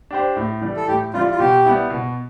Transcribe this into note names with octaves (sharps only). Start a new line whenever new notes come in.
D4 G4 C5
A2
E3 G3
A4
A2 G4
E3 G3 F4
F4
B2 G4
G3 B3 E4
B2